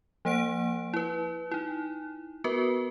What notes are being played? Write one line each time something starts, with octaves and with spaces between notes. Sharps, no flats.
F3 A#3 C5 F#5 D7
E4 B4
D#4 E4
B3 F#4 A#4 B4